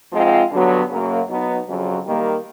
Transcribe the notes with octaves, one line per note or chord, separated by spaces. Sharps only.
G#2 F3 G#3 C4 F4
G2 D3 F#3 B3
F#2 C#3 F#3 A#3
B2 F#3 B3 D#4
F2 C#3 F#3
D#3 G3 A#3